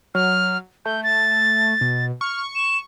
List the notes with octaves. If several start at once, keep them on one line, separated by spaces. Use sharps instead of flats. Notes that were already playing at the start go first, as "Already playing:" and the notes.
F#3 F6
A3 G6
A6
B2
C#6 F6
E7